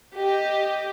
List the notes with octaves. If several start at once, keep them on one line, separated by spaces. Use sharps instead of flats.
G4 D#5